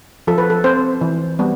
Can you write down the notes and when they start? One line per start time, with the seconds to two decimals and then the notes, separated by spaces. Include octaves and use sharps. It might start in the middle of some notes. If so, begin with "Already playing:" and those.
0.27 F3 A4
0.38 B4
0.50 A4
0.64 C4 C5
1.01 E3
1.39 G3 B3